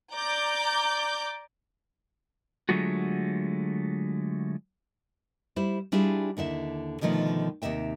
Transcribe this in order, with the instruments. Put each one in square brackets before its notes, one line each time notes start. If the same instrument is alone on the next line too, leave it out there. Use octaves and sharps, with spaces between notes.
[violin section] D5 A#5 D6 G6
[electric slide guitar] D3 F#3 G#3 A3 F4 F#4
[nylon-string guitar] G3 E4 C5
G3 D4 E4 F4 G4 G#4
D#2 D3 E4 E5
B2 D3 D#3 F3 A3
D#2 C3 D#4 E5 G5